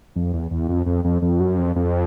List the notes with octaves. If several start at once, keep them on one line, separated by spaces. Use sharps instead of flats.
F2
E2
E2
F2
F2
F2
F2
F#2
F2
F2